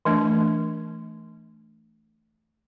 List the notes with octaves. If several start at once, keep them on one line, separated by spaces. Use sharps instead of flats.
E3 A3 D4